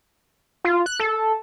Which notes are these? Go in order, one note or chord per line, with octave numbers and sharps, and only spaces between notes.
F4
F#6
A4